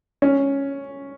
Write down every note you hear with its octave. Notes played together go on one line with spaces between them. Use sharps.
C#4